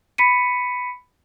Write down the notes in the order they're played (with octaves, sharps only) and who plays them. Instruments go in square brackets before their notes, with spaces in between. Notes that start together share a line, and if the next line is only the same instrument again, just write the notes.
[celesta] B5 B6 C#7 D#7